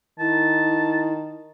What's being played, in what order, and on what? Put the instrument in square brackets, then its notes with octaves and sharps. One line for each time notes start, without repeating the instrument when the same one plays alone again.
[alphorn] D#3 [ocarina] E4 [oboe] A5